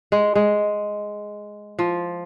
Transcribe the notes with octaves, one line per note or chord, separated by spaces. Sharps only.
G#3
G#3
F3